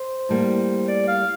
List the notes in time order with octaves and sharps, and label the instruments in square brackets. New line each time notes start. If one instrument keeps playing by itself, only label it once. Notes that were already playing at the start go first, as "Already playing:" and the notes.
Already playing: [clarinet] C5
[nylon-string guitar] A2 G3 A#3
[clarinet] D5
F5